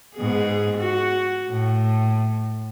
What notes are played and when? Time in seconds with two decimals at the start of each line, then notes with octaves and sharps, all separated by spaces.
0.15 G#2 B3 G#4
0.77 F#4
1.50 A2